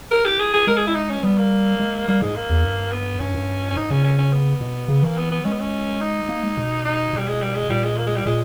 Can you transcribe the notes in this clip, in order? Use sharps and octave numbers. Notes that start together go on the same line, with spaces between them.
A#4
G4
G#4
G#4
G#3 A#4
G#4
E4
D#4
C#4
G3 B3
A#3
G#3
G3 A#3
G#2 G#3
A#3
E2
G2
B3
G2 C#4
G2
C#4
G#2 D#4
C#3 C#4
C#4
C#4
B3
B2
C#3
E3 A#3
B3
B3
G#3 C#4
B3
C#4
D#4
A#3
G#3
B2
D#4
B2 G3
G#3
G3
G#3
A#2 G3
G#3
A#3
G#3
G3
A#2 G#3